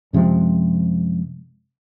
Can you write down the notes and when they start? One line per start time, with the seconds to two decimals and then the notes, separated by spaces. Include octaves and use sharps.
0.13 F#2 C3 F3 G#3